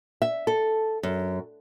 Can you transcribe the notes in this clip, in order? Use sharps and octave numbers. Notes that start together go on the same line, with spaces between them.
E5
A4
F#2